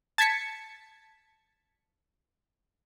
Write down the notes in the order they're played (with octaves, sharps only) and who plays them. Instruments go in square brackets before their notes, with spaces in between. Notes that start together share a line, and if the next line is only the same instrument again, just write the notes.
[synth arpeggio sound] A5 G#6 A6 B6 C#7